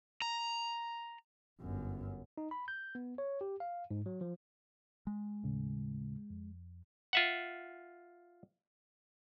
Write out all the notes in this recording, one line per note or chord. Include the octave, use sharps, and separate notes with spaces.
A#5
G1 F#2
D#4
B5
G6
B3
C#5
G4
F5
G#2
F#3
F3
G#3
D#2 A2 C#3
F2
F4 E5 F#5